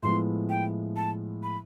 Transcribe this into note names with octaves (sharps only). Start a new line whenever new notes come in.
A2 F3 G#3 B3 E4 C6
G5
A5
B5